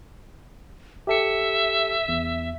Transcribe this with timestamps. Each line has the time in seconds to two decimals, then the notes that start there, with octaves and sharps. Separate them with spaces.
1.07 G4 A4 E5 C#7
2.08 E2